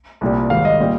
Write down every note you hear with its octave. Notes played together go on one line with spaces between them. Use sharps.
C2 A#2 G3
G#1 G#2 G3 F5
D#5
A#2 G3